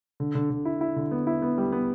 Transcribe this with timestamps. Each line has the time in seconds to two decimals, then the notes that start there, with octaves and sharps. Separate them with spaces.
0.20 D3
0.35 D3
0.50 D3
0.65 E4
0.81 E4
0.96 D3
1.11 B3
1.27 E4
1.42 B3
1.58 G3
1.72 B3